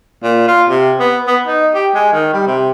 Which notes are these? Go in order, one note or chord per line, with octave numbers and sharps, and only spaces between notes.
A#2
F4
C3
B3
B3
D#4
G4
G#3
D#3
G3
C3